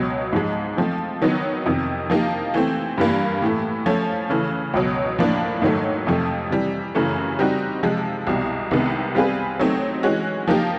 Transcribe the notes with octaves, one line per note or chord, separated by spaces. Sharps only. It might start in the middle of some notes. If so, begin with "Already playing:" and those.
Already playing: C#2 B2 F#3
G#2 F3 G#3
F3 A3 C4
D#3 F#3 B3 D#4
F2 C3 D#3
F3 A#3 D#4 G4
E3 A3 C4
G2 E3 G3 A#3
A2 E3 A3
F3 A3 C#4
C#3 E3 A3
C#2 B2 F#3
A2 F3 A#3 D4
G#2 D#3 F#3 A3
F2 C3 F3 A3
C3 E3 G3
F#2 C#3 E3 A3
G3 C4 D#4 F#4
C3 F3 G#3
C2 B2 G3
C2 C3 D#3 G#3 B3
G3 C4 F4 G#4 B4
F#3 A3 C4 D#4
E3 G#3 C#4 F#4
F3 A#3 D#4 G4